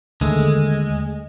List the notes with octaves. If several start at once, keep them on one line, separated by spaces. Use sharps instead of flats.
D#2 D3 G#3 A3